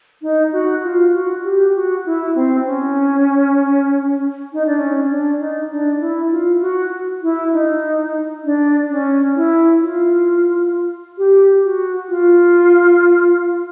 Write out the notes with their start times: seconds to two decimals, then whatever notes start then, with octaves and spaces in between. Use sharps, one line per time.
0.22 D#4
0.53 F#4
0.84 F4
1.14 F#4
1.44 G4
1.75 F#4
2.06 E4
2.35 C4
2.66 C#4
4.53 D#4
4.67 D4
4.79 C#4
5.10 D4
5.40 D#4
5.70 D4
6.00 E4
6.31 F4
6.61 F#4
7.23 E4
7.53 D#4
8.44 D4
8.90 C#4
9.36 E4
9.82 F4
11.18 G4
11.64 F#4
12.09 F4